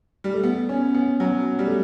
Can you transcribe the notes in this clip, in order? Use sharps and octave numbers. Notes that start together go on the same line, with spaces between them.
G3
A3
B3
C#4
B3
F#3
G3
A3